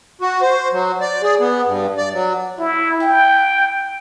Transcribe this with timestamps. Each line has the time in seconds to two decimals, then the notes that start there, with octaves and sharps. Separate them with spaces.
0.21 F#4
0.42 C5
0.73 F#3
1.01 D5
1.23 G#4
1.40 B3
1.66 G2
1.98 D5
2.13 F#3
2.59 E4
3.01 G5